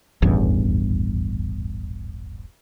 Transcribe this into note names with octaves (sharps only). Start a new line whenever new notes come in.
D#1 A1 E2 G2